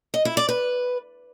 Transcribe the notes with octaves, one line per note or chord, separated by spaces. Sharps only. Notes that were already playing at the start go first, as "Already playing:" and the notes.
D#5
E4
D5
B4